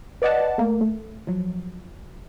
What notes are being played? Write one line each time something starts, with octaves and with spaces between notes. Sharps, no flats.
B4 D5 D#5 F#5 A5
A3 A#3
A3
F3 F#3